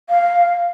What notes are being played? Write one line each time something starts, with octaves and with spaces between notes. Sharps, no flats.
F5